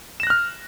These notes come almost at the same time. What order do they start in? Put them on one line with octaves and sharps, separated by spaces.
E7 A#6 F#6 F6